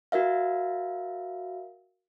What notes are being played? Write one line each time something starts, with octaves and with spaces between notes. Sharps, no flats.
F#4 A#4 E5 F5